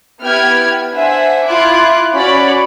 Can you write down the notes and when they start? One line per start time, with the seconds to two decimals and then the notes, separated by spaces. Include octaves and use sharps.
0.21 B3 E4 G4 G5 F6 G#6
0.94 D4 C5 E5 F#5 G#5
1.46 E4 F4 D6 F#6 G#6
2.14 C#4 F#4 C#5 D5 B5